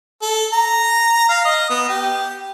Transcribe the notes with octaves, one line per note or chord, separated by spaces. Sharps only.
A4
A#5
F5
D#5
B3
G4